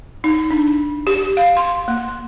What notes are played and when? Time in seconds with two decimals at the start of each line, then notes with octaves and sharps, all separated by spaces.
0.24 D#4
0.51 D4
1.07 G4
1.37 F5
1.57 C6
1.88 A#3